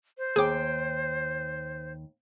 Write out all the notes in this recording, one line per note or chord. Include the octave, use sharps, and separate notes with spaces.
C5
D#2 G#4 G5 D6